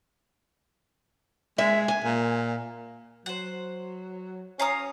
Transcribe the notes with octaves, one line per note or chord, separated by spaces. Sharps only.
G#3 E5
G#5
A#2
F#3 C5 F#5
C#4 F5 A#5 D#6